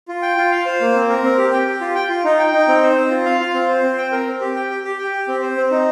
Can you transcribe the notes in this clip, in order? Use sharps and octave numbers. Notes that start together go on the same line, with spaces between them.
F4
G5
F4
F5
C5
A#3
C4
A#4
C4
G4
G5
G4
F4
G5
F4
D#4
G5
D#4
C4
C5
C4
F4
F5
F4
C4
C5
C4
G5
A#4
C4
G4
G5
G4
G4
G5
G4
C4
C5
C4
D#4